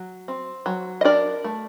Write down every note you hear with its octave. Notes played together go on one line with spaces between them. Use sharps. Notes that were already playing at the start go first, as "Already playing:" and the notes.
Already playing: F#3
C4
F#3
D#5
D4 A#4 D5
A3